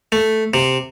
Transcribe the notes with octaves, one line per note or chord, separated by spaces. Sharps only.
A3
C3